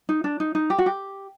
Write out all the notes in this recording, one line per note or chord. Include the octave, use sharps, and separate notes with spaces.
D#4
D4
D#4
D#4
G4
F#4
G4